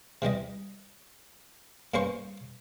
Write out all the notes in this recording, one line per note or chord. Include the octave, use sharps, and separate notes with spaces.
C3 E3 G3 D#5
G2 A#3 C#4 B4 C5 C#6